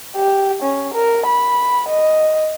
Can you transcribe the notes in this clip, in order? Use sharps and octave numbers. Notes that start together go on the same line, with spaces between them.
G4
C#4
A#4
B5
D#5